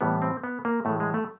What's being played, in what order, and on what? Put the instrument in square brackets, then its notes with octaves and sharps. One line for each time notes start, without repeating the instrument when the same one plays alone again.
[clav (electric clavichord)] A2 E3 G3 B3
C4
B3
A#3
A2 E3 G#3 A3
G#3
A3